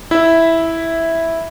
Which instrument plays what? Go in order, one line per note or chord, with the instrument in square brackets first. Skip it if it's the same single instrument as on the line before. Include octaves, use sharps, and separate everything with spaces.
[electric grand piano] E4 E5